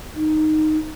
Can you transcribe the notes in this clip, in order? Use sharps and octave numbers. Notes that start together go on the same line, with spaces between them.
D#4